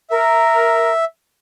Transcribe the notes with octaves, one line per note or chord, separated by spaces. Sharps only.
A#4 E5